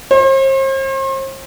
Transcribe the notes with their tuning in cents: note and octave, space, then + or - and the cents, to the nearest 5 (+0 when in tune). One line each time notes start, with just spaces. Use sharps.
C5 +40